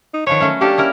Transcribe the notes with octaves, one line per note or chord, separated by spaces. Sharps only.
D#4
D#3 F3 B4 C#5
F#3 A3 C#4
A#3 D4 G4 A4
C#4 E4 A#4